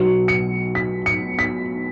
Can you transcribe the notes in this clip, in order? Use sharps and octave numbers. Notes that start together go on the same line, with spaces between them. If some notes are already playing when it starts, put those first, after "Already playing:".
Already playing: B1 B2 F#3 C#7
C#7
B6
C#7
B6